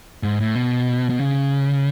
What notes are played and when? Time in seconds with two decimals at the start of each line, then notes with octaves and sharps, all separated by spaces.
0.23 G#2
0.40 A2
0.55 B2
1.10 B2
1.19 C#3